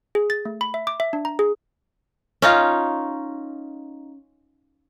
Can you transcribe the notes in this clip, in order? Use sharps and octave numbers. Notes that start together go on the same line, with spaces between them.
G#4
A6
A3
B5
E5
D6
E5
D4
A#5
G#4
C#4 D#4 F4